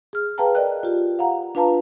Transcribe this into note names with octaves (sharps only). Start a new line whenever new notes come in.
G#4 F6
G#4 B4 F5 G5 A5 A#5
A#4 D5 D#5 G5 F#6
F4 G4
F5 F#5 A#5
D4 F4 B4 F5 A5 A#5